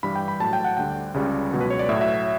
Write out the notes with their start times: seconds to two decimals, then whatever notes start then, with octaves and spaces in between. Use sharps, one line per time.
0.03 G2 E3 G3 B5
0.15 G5
0.28 B5
0.40 A2 F#3 A5
0.53 G5
0.65 F#5
0.77 D2 D3 G3 G5
1.14 C#2 C#3 G3
1.51 C#2 B2 F#3
1.61 B4
1.70 C#5
1.79 D5
1.89 A2 F#3 E5
2.01 E5